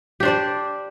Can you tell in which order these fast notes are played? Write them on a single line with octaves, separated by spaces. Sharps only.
G4 D4 C5 D5